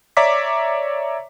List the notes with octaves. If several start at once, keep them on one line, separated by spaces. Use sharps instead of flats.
C#5 D5 E5 A#5 D6 B6